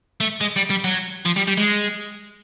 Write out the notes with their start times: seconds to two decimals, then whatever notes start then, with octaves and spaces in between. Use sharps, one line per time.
0.20 A3
0.41 G#3
0.56 G3
0.70 G3
0.84 F#3
1.26 F3
1.37 G3
1.48 G3
1.58 G#3